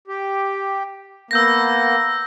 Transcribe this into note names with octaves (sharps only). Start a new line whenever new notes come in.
G4
A#3 B3 E6 G6 A#6